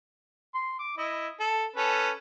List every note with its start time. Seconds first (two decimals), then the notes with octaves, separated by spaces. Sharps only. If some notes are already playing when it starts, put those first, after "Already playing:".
0.54 C6
0.79 D6
0.98 E4 D#5
1.40 A4
1.76 C#4 A4 B4